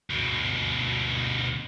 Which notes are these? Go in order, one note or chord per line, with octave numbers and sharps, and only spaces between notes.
D2 B2